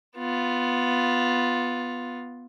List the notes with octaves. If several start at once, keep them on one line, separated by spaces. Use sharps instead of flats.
B3 F4